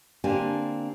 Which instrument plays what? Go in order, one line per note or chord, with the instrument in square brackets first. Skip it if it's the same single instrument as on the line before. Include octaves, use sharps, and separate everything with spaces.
[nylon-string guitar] D3 A#3 C4 D4 G4 G#5